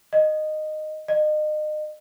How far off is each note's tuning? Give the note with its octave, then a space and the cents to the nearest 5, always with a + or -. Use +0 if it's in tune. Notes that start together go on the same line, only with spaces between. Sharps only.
D#5 -15
D#5 -35